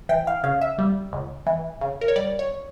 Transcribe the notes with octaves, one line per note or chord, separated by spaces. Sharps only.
E3 G5
F5
C#3 F5
E5
G3
C#2
E3
C#3
A#4
C#5
G3 D5
C#5